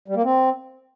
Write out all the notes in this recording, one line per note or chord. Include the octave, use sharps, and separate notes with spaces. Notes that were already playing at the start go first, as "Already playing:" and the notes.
G3
A#3
C4